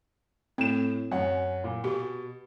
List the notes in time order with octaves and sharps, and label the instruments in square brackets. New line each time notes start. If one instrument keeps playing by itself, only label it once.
[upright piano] A2 E7 [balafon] C4
[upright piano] F#2 C#4 F#5
A#2
[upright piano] B2 [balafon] G4